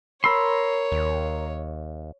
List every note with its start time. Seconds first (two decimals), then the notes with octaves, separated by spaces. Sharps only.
0.24 A#4 C#5 B5 C6 E6
0.92 D#2